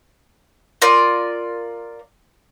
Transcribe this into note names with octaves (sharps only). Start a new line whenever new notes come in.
F4 A#4 D5